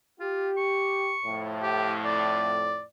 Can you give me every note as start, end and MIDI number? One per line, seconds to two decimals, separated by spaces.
0.20 0.51 65
0.20 1.14 67
0.57 1.46 85
1.24 2.82 41
1.24 2.82 45
1.63 1.93 67
2.05 2.83 74